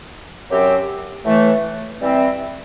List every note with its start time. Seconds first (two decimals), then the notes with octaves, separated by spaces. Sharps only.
0.50 F#2 F#3 C4 G4
1.24 A2 E3 A3
2.01 E3 G3 C4